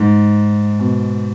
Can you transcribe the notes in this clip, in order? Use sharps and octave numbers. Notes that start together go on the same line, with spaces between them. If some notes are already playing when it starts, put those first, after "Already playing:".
Already playing: G#2
B2